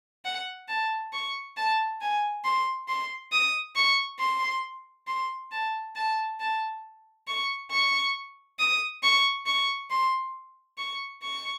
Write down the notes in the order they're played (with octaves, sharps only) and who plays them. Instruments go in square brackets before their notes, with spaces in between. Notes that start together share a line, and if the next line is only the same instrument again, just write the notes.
[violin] F#5
A5
C#6
A5
G#5
C6
C6
D#6
C#6
C6
C6
A5
A5
A5
C#6
C#6
D#6
C#6
C#6
C6
C#6
C#6